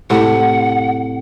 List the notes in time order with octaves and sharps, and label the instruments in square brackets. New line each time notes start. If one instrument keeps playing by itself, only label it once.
[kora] A2 C3 [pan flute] F#5